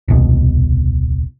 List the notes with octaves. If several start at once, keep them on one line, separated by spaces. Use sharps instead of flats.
D#1 C2 B2